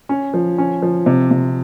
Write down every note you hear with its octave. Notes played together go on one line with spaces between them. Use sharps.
C#4
F3
C#4
F3
C3
C3